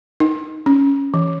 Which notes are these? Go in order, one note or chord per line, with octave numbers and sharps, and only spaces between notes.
D#4
C#4
E3